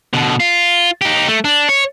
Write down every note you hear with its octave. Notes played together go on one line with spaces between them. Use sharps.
B2 D3
F4
D#4 G4
A3
D4
C#5